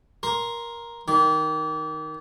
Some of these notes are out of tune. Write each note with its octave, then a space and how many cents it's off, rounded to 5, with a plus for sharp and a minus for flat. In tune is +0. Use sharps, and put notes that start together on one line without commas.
A#4 +10 C6 +0
D#3 +0 D6 -30